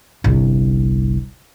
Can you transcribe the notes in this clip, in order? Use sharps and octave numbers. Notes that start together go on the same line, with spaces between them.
G1 C2